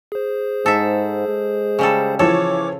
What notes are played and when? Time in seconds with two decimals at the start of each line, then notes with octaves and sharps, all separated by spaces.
0.12 G#4 C5
0.66 G#2 A4 E5
1.28 G#3
1.79 C#3 G3 A4
2.19 E3 F3 A4 C#5 D6